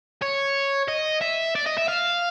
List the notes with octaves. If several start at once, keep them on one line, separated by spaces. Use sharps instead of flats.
C#5
D#5
E5
D5
D#5
E5
F5